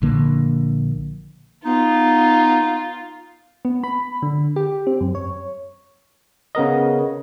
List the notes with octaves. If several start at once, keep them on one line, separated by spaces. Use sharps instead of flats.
A#1 D3 A#3
B3 D#4 F4
B3
B5
D3
G4
C4
F#2
C#5
C#3 B3 A#4 D#5